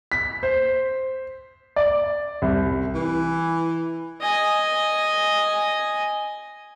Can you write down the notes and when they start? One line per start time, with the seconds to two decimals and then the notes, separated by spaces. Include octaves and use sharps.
0.12 B6
0.43 C5
1.76 D5
2.42 C2
2.94 E3
4.21 D#5 G#5